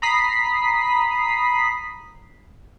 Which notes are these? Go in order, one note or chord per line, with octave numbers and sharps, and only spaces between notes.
A#5 B5 D#6 B6 C7